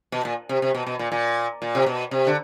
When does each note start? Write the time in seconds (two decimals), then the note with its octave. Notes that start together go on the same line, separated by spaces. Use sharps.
0.12 B2
0.25 A#2
0.49 C3
0.62 C3
0.74 B2
0.87 B2
0.99 A#2
1.12 A#2
1.62 A#2
1.75 C3
1.86 B2
2.11 C3
2.27 D3